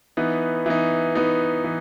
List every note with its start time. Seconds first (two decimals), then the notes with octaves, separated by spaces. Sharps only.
0.17 E3 B3 D#4
0.66 E3 B3 D#4
1.15 E3 B3 D#4
1.64 E3